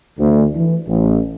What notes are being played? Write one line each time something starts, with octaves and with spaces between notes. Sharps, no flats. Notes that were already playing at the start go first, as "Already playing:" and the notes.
D2
E3
A1